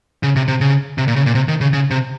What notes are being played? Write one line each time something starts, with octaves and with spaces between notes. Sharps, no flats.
C#3
C3
C3
C#3
C3
A#2
C#3
A#2
C3
D#3
C#3
C#3
C3